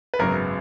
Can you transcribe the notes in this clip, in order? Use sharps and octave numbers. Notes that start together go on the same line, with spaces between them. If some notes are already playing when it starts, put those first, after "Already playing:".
B4
G#1 F#2 C#3 F#3 B3 A#4